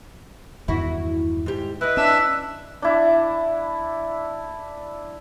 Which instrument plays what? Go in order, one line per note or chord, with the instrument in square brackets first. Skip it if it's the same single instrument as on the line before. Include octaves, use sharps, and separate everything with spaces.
[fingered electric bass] E2 G2 D#3 [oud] E4 F#4
[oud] G#2 G4
[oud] E4 D#5 [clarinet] B4
[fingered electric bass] C#4 [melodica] D4 E5 E6
[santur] D4 E4